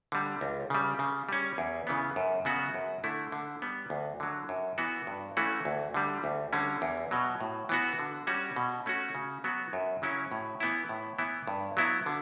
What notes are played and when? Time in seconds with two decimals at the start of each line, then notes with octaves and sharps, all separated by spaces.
0.12 D3 G3
0.41 C#2
0.70 C#3 G3
0.99 C#3
1.29 G3 C#4
1.58 E2
1.87 C#3 E3 B3
2.16 F#2
2.45 C#3 F#3 B3 F#4
2.74 F#2
3.04 D3 A3 E4
3.32 D3
3.62 G3 B3
3.90 D2
4.20 D3 F#3
4.49 F#2
4.78 E3 B3 F#4
5.07 G2
5.37 E3 A3 C#4 F#4
5.65 D2
5.94 D3 G3
6.24 D2
6.53 D3 G3 C#4
6.82 E2
7.11 B2 F#3
7.41 A2
7.69 E3 B3 F#4
7.99 D3
8.27 G3 C#4 F#4
8.56 B2
8.86 A3 C#4 F#4
9.15 C#3
9.44 F#3 B3 F#4
9.73 F#2
10.02 C#3 F#3 C#4 E4
10.31 A2
10.60 E3 B3 E4
10.89 A2
11.18 E3 B3 E4
11.47 G2
11.77 F#3 B3 E4
12.06 D3